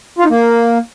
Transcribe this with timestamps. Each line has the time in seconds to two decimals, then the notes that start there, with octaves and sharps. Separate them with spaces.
0.19 F4
0.24 D#4
0.30 A#3